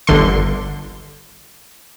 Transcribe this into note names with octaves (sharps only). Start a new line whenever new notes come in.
G1 D3 C6